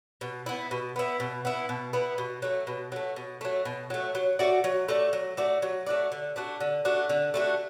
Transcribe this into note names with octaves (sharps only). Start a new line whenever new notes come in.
B2
B3 E4
B2
B3 E4
B2
B3 E4
B2
B3 E4
B2
F#3 A3
B2
F#3 A3
B2
F#3 A3
B2
F#3 A3
F#3
A3 F#4 D5
F#3
A3 F#4 D5
F#3
A3 F#4 D5
F#3
A3 F#4 D5
D3
A3 D4 F#4
D3
A3 D4 F#4
D3
A3 D4 F#4